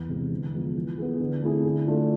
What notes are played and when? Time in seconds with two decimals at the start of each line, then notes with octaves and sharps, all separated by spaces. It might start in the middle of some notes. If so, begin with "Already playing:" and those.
Already playing: E2
0.09 C3 G#3
0.32 D3
0.53 F3 G#3 B3 F4
0.75 E3
0.98 B3 E4 G#4
1.20 D3
1.42 A3 C4 E4 G#4
1.64 D3
1.87 A3 D4 F4